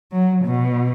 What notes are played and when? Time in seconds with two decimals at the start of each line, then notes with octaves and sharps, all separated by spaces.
0.12 F#3
0.45 B2